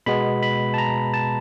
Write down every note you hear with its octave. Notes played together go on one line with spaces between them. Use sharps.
B2 G#3 B3 B5
B5
A5
A#5
A5